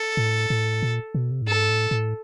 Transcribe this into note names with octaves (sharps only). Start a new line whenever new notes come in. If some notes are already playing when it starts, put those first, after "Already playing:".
Already playing: A4
A2
A2
A#2
B2
C3
A2
G#2 A4
A2
A2